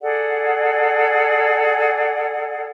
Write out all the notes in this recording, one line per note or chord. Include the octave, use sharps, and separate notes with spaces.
G#4 A4 D5 F#5